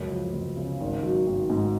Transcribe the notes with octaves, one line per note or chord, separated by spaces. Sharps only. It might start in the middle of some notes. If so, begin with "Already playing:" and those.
Already playing: C#2 F#2
F3
C#2
C#3
G#1
F#3
G#1
G#2